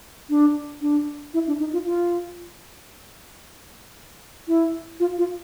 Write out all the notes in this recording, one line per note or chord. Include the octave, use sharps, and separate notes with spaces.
D4
D4
E4
D4
D#4
F4
F4
E4
F4
F4